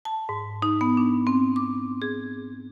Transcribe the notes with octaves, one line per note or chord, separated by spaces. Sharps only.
A5
G#2
D#4
B3
D4
C4
D6
G#4